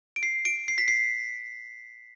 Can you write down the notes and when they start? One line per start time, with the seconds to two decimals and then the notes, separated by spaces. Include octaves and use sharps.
0.16 D7
0.23 C7
0.45 D7
0.68 C7
0.78 B6
0.88 C7